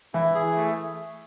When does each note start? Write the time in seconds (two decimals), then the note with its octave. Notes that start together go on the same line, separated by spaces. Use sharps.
0.14 E3 E4
0.35 G#4
0.56 A3